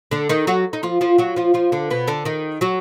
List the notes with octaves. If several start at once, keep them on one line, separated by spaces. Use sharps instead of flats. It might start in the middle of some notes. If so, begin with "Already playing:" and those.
D3 D4
D#3 D#4
F#3 F#4
D#4
F3 F4
F3 F4
F#3 F#4
F3 F4
F3 F4
D3 D4
B2 B3
D3 D4
D#3 D#4
F#3 F#4